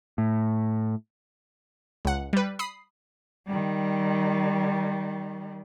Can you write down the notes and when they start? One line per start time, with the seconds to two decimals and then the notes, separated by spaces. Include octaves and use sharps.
0.18 A2
2.05 C#2 F#5
2.33 G3 B4
2.59 B5 D#6 C7
3.47 D#3 G3